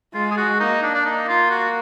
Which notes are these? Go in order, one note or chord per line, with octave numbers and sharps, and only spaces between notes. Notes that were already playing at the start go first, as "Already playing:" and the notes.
G#3 F4
G#4
F#4
A#3 D#4
D4
D4
A#3 D#4
F4
F#4